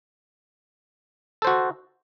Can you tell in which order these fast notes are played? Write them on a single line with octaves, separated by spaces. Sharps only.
A4 C5 F#4